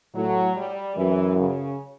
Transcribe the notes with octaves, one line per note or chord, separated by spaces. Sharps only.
A2 F#3
G3
F#2 E3
C#3